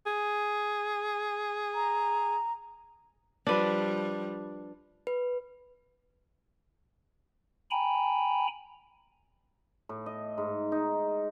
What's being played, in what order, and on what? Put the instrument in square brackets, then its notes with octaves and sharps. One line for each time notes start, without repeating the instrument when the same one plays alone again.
[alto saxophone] G#4
[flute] A#5
[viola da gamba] F3 G3 [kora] D4 B4
[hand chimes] B4
[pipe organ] G5 G#5 A#5 B5
[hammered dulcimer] A2
D#5
G#2
D#4